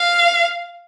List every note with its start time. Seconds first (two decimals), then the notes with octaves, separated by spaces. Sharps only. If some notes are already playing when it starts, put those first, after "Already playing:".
Already playing: F5